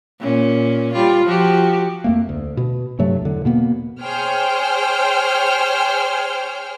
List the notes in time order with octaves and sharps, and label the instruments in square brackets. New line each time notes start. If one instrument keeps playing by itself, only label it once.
[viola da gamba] A#2 C#4
G3 F4
F3 F#4 G4
[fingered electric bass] F2 A3 A#3
D2
B2
G2 C3 F#3 A3
E2 D3
B2 A#3 B3
[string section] G#4 C5 C#5 G5 F6